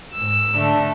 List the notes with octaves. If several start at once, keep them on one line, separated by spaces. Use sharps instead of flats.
G#2 E6
D3 A3 D4